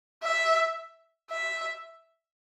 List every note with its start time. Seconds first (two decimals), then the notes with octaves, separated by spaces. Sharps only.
0.24 E5
1.31 E5